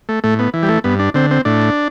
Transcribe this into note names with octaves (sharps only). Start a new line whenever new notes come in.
A3
A2 A3
B3
E3
G3
A3
G2 B3
D4
D3 C4
C4
A2 D4